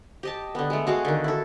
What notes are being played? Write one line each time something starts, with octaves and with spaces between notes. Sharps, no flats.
G4 D#5 A5
D3 B3
G#3 A3
G#3 F#4 G#4 F5
D3 D#3
E4 A4